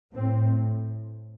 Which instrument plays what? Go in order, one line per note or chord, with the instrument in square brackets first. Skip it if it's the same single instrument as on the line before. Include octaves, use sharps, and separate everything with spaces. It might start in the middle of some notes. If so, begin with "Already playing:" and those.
[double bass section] A2 C4